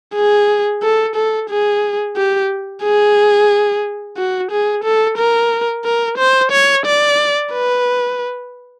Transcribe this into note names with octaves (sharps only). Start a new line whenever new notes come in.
G#4
A4
A4
G#4
G4
G#4
F#4
G#4
A4
A#4
A#4
C5
C#5
D5
B4